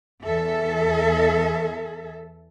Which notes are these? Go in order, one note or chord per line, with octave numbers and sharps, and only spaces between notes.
E2 A4 E5